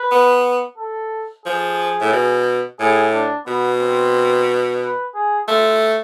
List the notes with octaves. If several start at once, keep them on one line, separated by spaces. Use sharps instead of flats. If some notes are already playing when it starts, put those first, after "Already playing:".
Already playing: B4
B3
A4
F3 G#4
A2
B2
A2 G#4
D4
B2 B3
C4
B4
G#4
A3 F4